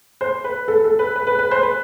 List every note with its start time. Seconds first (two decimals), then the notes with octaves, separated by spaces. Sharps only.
0.21 C5
0.44 B4
0.68 A4
0.84 A4
0.99 B4
1.15 B4
1.27 B4
1.39 B4
1.51 C5
1.63 B4